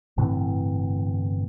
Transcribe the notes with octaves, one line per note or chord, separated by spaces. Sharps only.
G1 A2 C3 E3